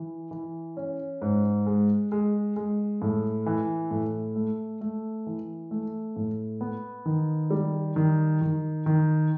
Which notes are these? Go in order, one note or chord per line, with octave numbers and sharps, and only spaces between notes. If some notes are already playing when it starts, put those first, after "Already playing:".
Already playing: E3
E3
C#4
G#2
G#3
G#3
G#3
A2
E3
A2
A3
A3
E3
A3
A2
B3
D#3
G3
D#3
D#3
D#3